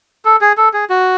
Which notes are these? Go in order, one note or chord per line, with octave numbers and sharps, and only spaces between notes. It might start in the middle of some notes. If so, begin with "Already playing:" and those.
A4
G#4
A4
G#4
F#4